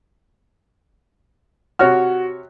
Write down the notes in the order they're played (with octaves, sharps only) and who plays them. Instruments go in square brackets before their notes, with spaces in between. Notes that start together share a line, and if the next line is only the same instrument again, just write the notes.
[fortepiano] C3 C#5 F6 [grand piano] F#4